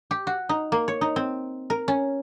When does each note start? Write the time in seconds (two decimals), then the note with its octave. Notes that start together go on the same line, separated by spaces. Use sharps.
0.11 G4
0.27 F#4
0.49 D#4
0.72 A#3
0.88 C#5
1.01 D#4
1.16 C4
1.70 A#4
1.88 C#4